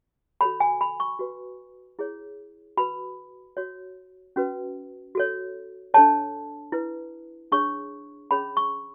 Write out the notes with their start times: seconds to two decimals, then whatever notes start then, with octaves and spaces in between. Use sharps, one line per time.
0.41 F#4 A4 C#5 B5
0.60 G#5
0.81 B5
1.00 C#6
1.19 F#4 B4
1.99 E4 G#4 C#5
2.77 F#4 B4 B5
3.57 F#4 C#5
4.36 C#4 F#4 B4
5.15 F#4 A4 C#5
5.94 D4 A4 C#5 A5
6.72 E4 B4
7.52 D4 G#4 C#5 C#6
8.31 C#4 G#4 C#5 B5
8.57 C#6